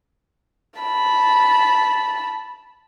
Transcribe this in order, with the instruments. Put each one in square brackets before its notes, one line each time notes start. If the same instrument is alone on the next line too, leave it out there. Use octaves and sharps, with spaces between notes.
[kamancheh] A5 B5